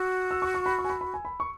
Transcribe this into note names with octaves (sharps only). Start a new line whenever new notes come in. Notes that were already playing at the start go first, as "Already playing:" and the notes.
Already playing: F#4 E6
E6
C#6
C#6
B5
C#6
G#5
B5
B5
G#5
B5
C#6